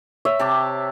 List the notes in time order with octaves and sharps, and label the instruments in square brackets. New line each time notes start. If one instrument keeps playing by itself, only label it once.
[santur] C#5 E5
[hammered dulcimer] C3 A5 D6